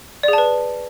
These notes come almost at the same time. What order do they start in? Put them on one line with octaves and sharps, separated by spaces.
D5 G#4 A5 B4